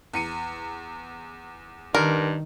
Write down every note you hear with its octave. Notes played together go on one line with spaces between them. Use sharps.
E2 C#7 D#7
G2 D#3 A#4